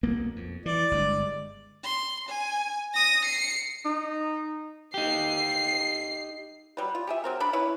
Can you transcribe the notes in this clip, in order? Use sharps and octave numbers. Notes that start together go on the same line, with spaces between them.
B1 A#3 B3
F2
E3 D5
G1 G2 G#3
C6
G#5
D#6 A#6
C7 C#7
D#4
D#4 G4 C7
F#3 G3 B4
F4
G4 G#4 E5
F#3 C4 A#4
D4 D5 B5
C#4 E4 B4 C#5